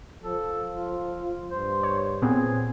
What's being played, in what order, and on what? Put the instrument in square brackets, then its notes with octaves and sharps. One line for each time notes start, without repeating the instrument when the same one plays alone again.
[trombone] F3 [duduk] A4
[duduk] F4
[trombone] G2 [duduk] C5
[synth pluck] C#5
[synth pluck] A#2 B3 C4 [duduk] G#4